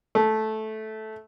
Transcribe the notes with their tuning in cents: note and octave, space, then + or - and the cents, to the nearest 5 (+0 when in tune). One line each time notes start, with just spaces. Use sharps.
A3 -10